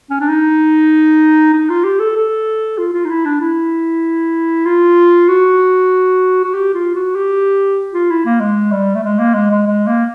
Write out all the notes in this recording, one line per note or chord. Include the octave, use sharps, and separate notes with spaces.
C#4
D4
D#4
D#4
F4
G4
A4
A4
F4
F4
D#4
E4
D4
E4
F4
F#4
F#4
G4
F4
F#4
G4
F4
E4
A#3
G#3
G3
A3
G#3
A#3
G#3
G#3
G#3
A#3